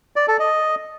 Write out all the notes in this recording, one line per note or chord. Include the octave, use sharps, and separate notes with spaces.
D5
A4
D#5